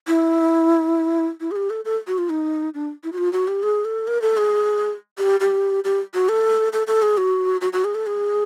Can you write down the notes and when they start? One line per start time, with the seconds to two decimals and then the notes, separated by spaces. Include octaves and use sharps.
0.08 E4
1.41 E4
1.51 G#4
1.56 G4
1.70 A4
1.85 A4
2.07 F#4
2.18 F4
2.30 D#4
2.74 D4
3.04 E4
3.12 F#4
3.18 F4
3.33 F#4
3.48 G4
3.63 G#4
3.85 A4
4.07 A#4
4.22 A4
4.37 G#4
5.18 G4
5.40 G4
5.84 G4
6.14 F#4
6.29 A4
6.73 A4
6.87 A4
7.02 G#4
7.17 F#4
7.61 F#4
7.73 F#4
7.84 G#4
7.95 A4
8.06 G#4